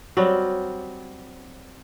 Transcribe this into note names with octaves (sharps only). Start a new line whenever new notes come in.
F#3 G3 C4